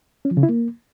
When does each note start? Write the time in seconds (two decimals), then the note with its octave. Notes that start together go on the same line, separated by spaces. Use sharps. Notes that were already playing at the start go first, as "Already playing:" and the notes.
0.25 C#4
0.31 F3
0.37 C#3
0.43 E4
0.49 A#3